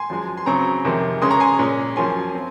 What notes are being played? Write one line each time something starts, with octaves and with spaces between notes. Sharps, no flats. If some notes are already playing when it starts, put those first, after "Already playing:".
Already playing: G#5 C6
F#2 F3 G#3
C6
C#3 F#3 C4 A#5 C#6
F2 C3 D#3 G#3
C#3 G#3 C#4 C6 D#6
A#5 C#6
G#5 C6
A#2 G#3 C#4
F#2 F3 A#3 C#4 G#5 C6
C4